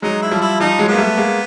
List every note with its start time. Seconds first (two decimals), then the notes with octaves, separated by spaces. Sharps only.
0.02 F#3 G#3 D#4
0.22 E4
0.31 F3 G3
0.42 E4
0.60 F3 G3 D#4
0.79 F#3 G#3
0.88 A#3 B3
0.98 G3 A3
1.17 G#3 A#3